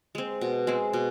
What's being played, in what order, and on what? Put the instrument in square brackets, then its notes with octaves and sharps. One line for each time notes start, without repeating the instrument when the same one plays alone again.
[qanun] G#3 C4
B2
G#3 C4
B2